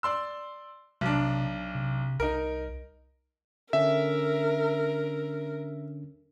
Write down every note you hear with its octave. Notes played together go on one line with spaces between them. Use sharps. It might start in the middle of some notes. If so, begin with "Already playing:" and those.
D5 C6 E6
B1 C3 D4
C3
C2 D#4 A#4
D3 C#4 D4 A#4 E5